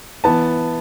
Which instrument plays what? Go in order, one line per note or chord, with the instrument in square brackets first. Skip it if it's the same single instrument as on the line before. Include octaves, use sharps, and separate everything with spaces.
[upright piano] E3 B3 A5